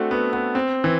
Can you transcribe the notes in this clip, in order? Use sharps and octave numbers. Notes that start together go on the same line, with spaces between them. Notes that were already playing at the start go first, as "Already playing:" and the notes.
Already playing: A3 C4 D4 F#4
B3
B3
C4
E3